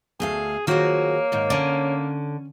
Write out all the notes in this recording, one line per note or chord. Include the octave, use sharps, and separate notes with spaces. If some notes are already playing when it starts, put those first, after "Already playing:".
D2 A3 G#4 F5
D#3 F3 F#3 A#3 F#4 G#4 C#5
G#2 D#3
D3 C#4 D5